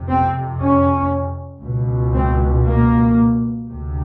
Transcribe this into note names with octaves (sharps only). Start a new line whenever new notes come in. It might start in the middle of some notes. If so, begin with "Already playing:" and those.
Already playing: F2 C3
C4
C#4
C#2 B2
C4
A#3
D2 C3